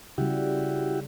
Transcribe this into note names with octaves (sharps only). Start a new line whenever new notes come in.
C#3 G3 E4 F#4 G4